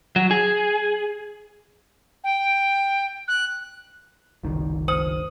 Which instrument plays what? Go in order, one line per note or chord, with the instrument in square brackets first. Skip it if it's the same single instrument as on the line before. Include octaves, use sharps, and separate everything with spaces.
[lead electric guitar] F#3
G#4
[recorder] G5
F#6
[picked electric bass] F#1 C2 D#3
[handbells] C5 [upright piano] D#6